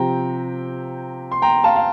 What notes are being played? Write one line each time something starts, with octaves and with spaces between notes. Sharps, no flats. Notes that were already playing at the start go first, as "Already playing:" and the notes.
Already playing: C3 F3 C4 G5 A#5
C6
G5 A#5
F5 A5
F5